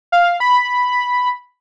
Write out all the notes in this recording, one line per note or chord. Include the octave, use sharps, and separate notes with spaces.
F5
B5